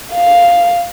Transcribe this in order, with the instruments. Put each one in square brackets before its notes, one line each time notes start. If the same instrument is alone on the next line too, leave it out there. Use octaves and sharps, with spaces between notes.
[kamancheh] F5